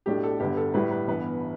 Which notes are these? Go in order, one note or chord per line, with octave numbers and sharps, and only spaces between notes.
B1 A2 A3 D4 G4
A4
G1 G2 D3 G4
A4
A2 G3 E4 B4
B4
G1 G2 E3 B3 B4